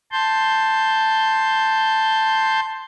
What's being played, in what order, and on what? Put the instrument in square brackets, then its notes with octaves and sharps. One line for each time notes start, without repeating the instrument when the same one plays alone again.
[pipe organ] A5 C6 G6